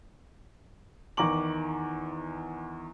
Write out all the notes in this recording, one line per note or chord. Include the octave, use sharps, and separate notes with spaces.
E2 D#3 A#5 C#6 D6 F#7